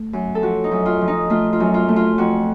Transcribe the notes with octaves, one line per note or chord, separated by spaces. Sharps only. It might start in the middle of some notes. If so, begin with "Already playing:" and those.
Already playing: A3
F#2
A4
F3 F#4
D#4
F#2
F4
F3
D#4
A3 F4
F4
F#2
F4
A3
F4
F2 F#4